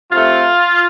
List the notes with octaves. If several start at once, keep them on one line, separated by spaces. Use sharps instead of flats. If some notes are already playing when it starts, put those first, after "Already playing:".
C3 A3 F4